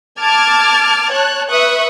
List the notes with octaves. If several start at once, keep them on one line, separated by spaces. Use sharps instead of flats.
A5 D6 F6 G#6 A6
C#5 A5 F#6
B4 E5 C#6 D#6 F#6